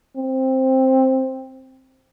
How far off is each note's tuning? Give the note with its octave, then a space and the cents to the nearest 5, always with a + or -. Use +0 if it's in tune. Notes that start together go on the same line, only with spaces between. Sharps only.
C4 +5